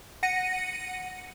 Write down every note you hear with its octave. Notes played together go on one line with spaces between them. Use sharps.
F#5 A#6 C#7 D#7